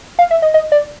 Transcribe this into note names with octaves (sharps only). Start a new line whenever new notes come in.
F5
E5
D#5
D#5
D5